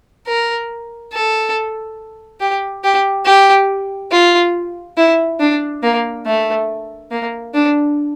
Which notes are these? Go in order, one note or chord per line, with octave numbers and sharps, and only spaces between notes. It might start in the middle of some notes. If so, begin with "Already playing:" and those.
A#4
A4
G4
G4
G4
F4
E4
D4
A#3
A3
A#3
D4